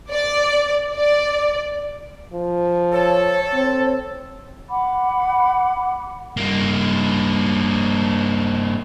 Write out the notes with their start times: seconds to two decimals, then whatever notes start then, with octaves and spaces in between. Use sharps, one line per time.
0.11 D5
0.93 D5
2.34 F3
2.93 A4 C#5
3.53 C4
4.69 F#5 B5 D6
6.37 G2 A#3